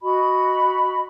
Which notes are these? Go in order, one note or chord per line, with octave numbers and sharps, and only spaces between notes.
F#4 D#5 B5